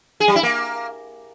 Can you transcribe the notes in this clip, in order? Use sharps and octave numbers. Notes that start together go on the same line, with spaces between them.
G#4
G3
E4
A#3